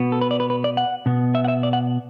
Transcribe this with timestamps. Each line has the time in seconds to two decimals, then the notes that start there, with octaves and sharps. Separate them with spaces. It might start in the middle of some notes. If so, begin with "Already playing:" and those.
Already playing: B2 B3
0.12 A4
0.21 B4
0.31 D5
0.40 B4
0.50 B4
0.64 D5
0.77 F#5
1.06 B2 B3
1.35 E5
1.45 F#5
1.48 E5
1.63 D5
1.73 F#5